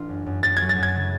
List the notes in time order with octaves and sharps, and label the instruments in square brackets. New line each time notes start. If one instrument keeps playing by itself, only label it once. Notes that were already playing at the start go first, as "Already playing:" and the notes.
Already playing: [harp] A1 D4 F4
F#2
F#2
[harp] F#2 [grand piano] A6
[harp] F#3 [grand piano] G#6
[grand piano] A6
[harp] F#2 [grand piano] G#6
[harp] C#3